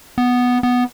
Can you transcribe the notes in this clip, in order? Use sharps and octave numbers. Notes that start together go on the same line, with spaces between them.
B3
B3